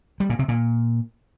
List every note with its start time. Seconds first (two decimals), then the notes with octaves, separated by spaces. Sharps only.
0.20 G3
0.30 A#2
0.39 C3
0.48 A#2